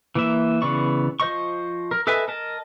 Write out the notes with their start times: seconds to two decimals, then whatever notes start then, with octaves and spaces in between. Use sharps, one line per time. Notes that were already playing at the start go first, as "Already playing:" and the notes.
0.15 E3 A#3 E5
0.62 C#3 E3 B3 D5 C#6
1.20 F3 C5 D#5 C#6
1.91 A#4
2.07 A4 B4 D#5 E5 G#5
2.28 A#4 D#5 A5